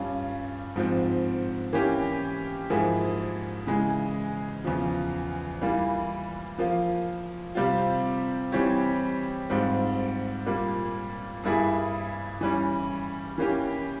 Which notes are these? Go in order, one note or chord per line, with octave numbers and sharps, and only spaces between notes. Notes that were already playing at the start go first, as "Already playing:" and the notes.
Already playing: G2 G3 C#4 F4
G#2 F3 C4
E3 A#3 C#4 G4
G#2 F3 A#3 E4 G#4
C#3 E3 G#3
E2 C#3 F3
E3 G3 A#3 F4
F3 A#3 F4
C3 G3 C4 F4
E3 G3 C4 G4 C#5
G#2 G3 C4 F4
A#2 G3 A#3
G2 G3 A#3 E4 G#4
E3 G3 C#4
E3 A#3 C#4 G4